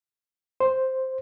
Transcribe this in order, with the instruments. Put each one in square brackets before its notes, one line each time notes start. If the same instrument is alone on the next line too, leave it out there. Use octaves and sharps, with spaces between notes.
[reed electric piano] C5